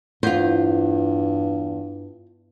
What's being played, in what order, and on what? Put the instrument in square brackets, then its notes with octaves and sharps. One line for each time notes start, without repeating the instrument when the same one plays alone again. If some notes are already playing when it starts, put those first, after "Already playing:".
[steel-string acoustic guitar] E2 [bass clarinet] G2 [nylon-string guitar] F4 C5